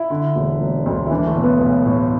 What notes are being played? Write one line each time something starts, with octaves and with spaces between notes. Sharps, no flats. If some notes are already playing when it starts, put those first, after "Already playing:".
Already playing: E4
D3
E1
E1
D2
E4
E3 D4
A3
B1
B3
B1
A2